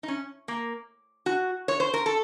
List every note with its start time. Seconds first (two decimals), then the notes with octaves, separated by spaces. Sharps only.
0.03 D#4
0.08 C#4
0.48 A#3
1.26 F#4
1.68 C#5
1.80 C5
1.94 A#4
2.06 A4